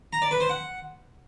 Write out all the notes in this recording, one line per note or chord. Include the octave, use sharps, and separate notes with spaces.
A#5
D5
B4
C5
F#5